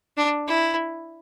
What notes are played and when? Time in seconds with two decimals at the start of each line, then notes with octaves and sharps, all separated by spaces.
0.17 D4
0.47 E4